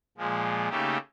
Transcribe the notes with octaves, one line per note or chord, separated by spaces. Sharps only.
A#2 F3 G#3
C#3 A3 A#3 D#4 G4